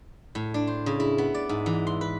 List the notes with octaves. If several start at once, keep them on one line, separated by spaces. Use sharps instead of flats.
A2
D4
C5
C#3
E4
B3
D5
G#2
E3
C6
B4